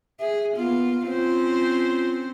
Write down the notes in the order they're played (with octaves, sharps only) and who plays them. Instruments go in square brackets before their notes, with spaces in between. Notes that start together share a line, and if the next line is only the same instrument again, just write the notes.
[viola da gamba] G#4 [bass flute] E5
[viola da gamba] A#3 F4 [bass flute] B3
[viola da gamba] C4 C#4 C5 [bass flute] F4